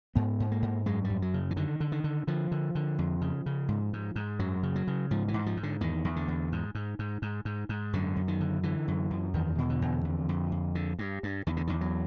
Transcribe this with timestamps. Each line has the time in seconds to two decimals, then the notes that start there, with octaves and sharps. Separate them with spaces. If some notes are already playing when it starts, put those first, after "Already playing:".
0.15 G#2 B3
0.40 G#2
0.52 A#3
0.62 G#2
0.86 F#2 G#3
1.04 G3
1.10 F#2
1.22 F#3
1.34 C#3
1.51 E3
1.56 D3 D#3
1.80 D3
1.92 D#3
2.04 D3
2.27 D3 F3
2.52 D3
2.75 D3
2.99 F2
3.21 C#3
3.46 C#3
3.68 G#2
3.93 G#2
4.16 G#2
4.39 F#2 F#3
4.63 C#3
4.76 F#3
4.87 C#3
5.11 G#2 F3
5.28 E3
5.34 G#2
5.46 F3
5.57 G#2
5.63 D3
5.81 E2 D#3
6.05 E2
6.16 D3
6.28 E2
6.52 G#2
6.75 G#2
6.99 G#2
7.22 G#2
7.45 G#2
7.69 G#2
7.93 F#2 D3
8.16 F#2
8.28 D#3
8.41 D3
8.63 D3 E3
8.88 F#2
9.11 F#2
9.34 E2 D#3
9.58 B2
9.70 D3
9.82 E2
10.05 F2
10.29 F2
10.52 F2
10.75 D3
10.99 G2
11.23 G2
11.47 E2 D#3
11.57 D3
11.67 E2 D#3
11.81 F#3